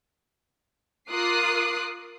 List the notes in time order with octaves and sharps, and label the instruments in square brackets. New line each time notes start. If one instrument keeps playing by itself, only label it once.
[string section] F4 A#4 D6 D#6 F#6 C7